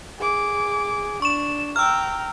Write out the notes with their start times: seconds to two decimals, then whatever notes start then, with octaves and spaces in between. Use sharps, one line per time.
0.19 G#4 D6
1.22 D4 C#6 E7
1.76 G5 A#5 E6 F6